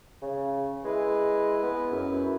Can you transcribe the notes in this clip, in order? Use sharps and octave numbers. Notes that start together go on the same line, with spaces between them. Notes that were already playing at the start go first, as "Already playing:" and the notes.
C#3
G#3 E4 B4
B3
F#2